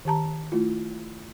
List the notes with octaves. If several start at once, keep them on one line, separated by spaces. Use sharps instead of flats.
D#3 G4 A5 A#5
A3 E4 F4